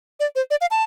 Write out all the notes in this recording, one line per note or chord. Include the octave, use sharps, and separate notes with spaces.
D5
C5
D5
F5
A5